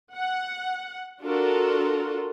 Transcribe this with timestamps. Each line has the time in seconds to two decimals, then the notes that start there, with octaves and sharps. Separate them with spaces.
0.13 F#5
1.21 D4 F4 F#4 A4 A#4